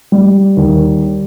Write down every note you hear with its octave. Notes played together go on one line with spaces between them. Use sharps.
G3
D#2